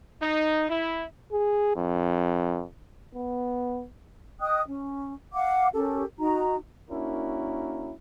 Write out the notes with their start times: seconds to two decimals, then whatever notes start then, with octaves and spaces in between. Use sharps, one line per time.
0.22 D#4
0.69 E4
1.32 G#4
1.76 F2
3.15 B3
4.41 D#5 G5 D#6 F#6
4.67 C#4
5.33 F5 F#5 D6
5.74 C#4 G4 A4 A#4
6.18 D#4 F#4 A#5
6.91 A#3 C#4 D4 E4 F#4 A#4